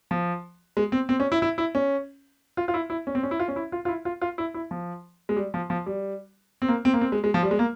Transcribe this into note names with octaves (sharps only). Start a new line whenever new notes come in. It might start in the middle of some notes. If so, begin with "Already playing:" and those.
F3
G#3
C4
C4
C#4
E4
E4
E4
C#4
F4
F4
E4
E4
C#4
C4
C#4
E4
F4
C#4
E4
F4
F4
E4
F4
F4
E4
E4
F3
G#3
G3
F3
F3
G3
C4
A#3
C4
A#3
C4
G#3
G#3
F3
G3
G#3
A#3